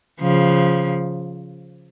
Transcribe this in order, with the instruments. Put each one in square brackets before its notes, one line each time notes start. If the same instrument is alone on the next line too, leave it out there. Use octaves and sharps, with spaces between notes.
[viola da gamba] C#3 F3